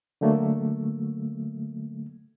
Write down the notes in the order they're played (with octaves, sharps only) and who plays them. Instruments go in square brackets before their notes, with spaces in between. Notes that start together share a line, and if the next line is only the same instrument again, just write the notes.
[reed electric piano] D3 F#3 A3 A#3